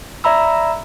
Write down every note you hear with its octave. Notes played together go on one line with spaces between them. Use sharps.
D5 E5 A#5 B5 E6